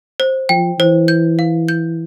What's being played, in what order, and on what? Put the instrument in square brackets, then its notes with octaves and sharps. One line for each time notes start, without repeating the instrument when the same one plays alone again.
[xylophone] C5
[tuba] F3 [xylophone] G5
[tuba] E3 [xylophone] C5
[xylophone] G6
F5
G6